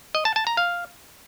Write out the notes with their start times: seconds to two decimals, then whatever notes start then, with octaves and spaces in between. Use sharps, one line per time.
0.15 D#5
0.25 A5
0.36 A5
0.47 A#5
0.57 F5